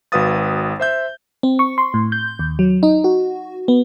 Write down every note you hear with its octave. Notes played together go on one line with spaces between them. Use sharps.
G#1 F#4 B4 F5 D#6 A6
C5 E5 G6
C4
C#6
C6
A2
G6
D#2
F#3
D#4
F#4
B3